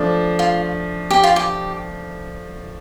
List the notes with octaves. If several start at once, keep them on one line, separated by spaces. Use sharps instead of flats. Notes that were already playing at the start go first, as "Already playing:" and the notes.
Already playing: F3 A3 D4
F4
G4
F4
G4